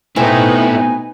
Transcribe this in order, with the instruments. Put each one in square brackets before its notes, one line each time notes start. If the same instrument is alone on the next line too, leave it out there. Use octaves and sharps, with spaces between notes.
[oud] B2 C4 [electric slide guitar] A3 E4 [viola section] D#4 B4 [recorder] G#5